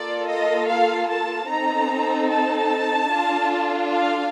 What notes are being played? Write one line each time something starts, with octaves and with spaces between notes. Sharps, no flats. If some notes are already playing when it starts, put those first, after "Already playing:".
Already playing: A#3 F4 A4 D5
D#5
F5
A5
C4 D#4 A4 A#5
A5
D4 F4 A4
F5